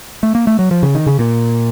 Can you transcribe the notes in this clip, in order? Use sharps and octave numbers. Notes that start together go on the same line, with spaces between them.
A3
A#3
A3
F#3
F3
C#3
D#3
C#3
A#2